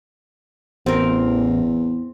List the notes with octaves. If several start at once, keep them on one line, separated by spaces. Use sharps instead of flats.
A1 E2 C4 A#4